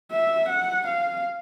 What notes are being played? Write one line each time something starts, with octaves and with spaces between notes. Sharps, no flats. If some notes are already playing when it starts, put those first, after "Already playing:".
E5
F#5
F5